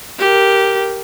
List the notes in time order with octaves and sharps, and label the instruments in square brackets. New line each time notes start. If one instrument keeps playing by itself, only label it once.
[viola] G4 A#4